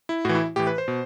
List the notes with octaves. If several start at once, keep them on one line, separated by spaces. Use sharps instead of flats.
E4
A2 E3 F#4
E4
A2 E3 G4
B4
C5
B2